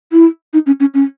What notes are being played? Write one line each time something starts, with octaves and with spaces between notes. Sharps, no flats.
E4
D#4
C#4
C#4
C#4